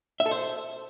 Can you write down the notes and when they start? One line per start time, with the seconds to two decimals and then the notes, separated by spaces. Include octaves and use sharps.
0.20 E5
0.26 A4
0.31 C5